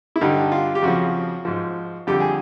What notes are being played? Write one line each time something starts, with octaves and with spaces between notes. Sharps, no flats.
E4
G2 D3 G3 D#4
F4
G4
F2 C#3 F3 F#4
G#2 F3
F2 D3 G3 G4
G#4